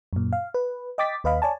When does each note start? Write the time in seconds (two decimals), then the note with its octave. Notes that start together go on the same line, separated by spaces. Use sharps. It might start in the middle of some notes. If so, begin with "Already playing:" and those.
0.13 F#2 A#2
0.33 F5
0.54 B4
0.98 D#5 G5 D6 A6 B6
1.24 D#2 B4 D#5 F5 B5
1.42 C#5 D5 G#5 A5